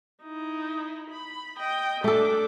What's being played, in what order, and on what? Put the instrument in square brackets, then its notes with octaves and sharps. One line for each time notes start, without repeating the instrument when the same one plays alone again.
[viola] D#4 E4
B5
D#5 G5
[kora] A3 A4 [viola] D4 D6